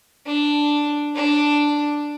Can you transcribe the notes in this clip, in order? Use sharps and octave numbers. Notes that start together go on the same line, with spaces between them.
D4
D4